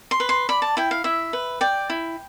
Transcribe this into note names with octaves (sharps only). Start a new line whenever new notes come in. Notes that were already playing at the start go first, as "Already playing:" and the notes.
C6
B4
C6
D5 B5
A5
E4 G5
F5
E4 E5
B4
D5 G5
E4